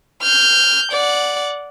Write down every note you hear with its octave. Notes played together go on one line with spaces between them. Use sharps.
F6 G6
D5 F#5